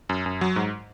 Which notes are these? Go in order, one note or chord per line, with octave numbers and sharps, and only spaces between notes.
F#2
F#2
F#3
G#2